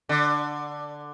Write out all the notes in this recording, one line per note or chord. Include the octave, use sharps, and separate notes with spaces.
D3